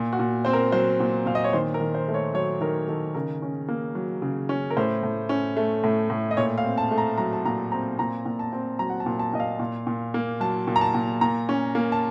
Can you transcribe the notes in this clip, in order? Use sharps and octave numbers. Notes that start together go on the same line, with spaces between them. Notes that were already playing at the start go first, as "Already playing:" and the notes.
Already playing: A#2
F#4
A#2
C4 C5
A#4
F#3 C5
A#2
A#2 F5
D#5
C#5
D#3 C5
A#4
D#3
C5
A3
C#5
F#3 C#5
D#3 A#4
D#3 A4
C#3 A#4
C#4
A#3
F#3
C#3
C#4
A#4
A2 C5
A2
C#4
A3
A2
A2
D#5
A#2 C#5
F5
C4
A5
A3
A#5
F#3 A#5
A5
A#2 A#5
C4 A#5
A#2 A#5
A#2
A5
C4
F#3 A#5
F#5
A5
A#2
A5
A#2 D#5
F5
A#2
A#2
A#3
F#3 A5
A#2
A#5
A5
A#2
A#2 A#5
C#4
A#3
A5